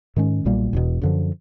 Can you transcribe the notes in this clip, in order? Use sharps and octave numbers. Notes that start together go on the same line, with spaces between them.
G#2 D#3 G#3 C#4
B1 A#2 G3 A#3
E1 E2 B2
F#2 D3 F3